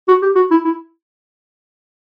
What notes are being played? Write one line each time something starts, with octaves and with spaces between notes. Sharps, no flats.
F#4
G4
F#4
E4
E4